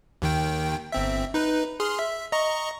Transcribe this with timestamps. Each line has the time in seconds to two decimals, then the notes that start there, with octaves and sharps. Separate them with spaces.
0.22 D#2 D#3 G5
0.92 G1 C4 E5
1.34 D#4 B4
1.80 G#4 C6 F6
1.99 E5
2.32 D#5 A#5 C#6